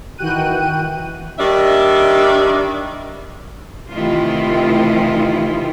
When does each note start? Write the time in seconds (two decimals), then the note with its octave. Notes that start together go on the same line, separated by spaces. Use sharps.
0.18 D#3 E3 F#4 G5 F#6 D#7
1.39 D#3 G3 D4 E5
3.92 C3 D#3 E3 A3 E4 F4